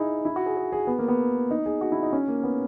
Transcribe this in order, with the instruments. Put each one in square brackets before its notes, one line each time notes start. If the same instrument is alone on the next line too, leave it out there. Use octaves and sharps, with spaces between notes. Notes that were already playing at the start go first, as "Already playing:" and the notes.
Already playing: [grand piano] D#4 E4 G#4
E4
F#4
G#4
G#4
G#4
B3
A#3
B3
D#4
G#4
F#4
E4
D#4
C#4
A#3
B3